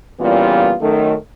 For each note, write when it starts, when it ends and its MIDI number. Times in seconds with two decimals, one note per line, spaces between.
0.20 0.73 46
0.20 0.73 49
0.20 0.73 52
0.20 0.73 55
0.20 0.73 59
0.20 0.73 65
0.81 1.14 42
0.81 1.14 51
0.81 1.14 57